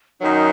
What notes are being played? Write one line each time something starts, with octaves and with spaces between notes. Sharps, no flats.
F#2 D#3 F#3 D#4